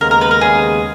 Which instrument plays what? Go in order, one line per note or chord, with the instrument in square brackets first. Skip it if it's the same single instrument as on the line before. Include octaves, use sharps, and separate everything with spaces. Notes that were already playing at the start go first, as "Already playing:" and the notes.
[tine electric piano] D#2 C#3 G#3 B3 [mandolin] A#4
[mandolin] A#4
B4
A#4
[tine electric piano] D#2 C#3 G#3 B3 [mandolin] G#4